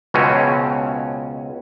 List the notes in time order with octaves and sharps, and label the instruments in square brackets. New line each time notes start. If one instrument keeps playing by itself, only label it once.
[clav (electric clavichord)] C#2 B2 C4 C#4